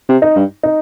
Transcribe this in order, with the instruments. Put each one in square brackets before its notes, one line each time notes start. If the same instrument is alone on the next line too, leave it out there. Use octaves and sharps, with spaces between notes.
[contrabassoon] C3
[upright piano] D#4
[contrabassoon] G2
[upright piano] D#4